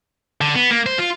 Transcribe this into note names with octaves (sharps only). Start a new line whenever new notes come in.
D3
B3
A#3
C5
F4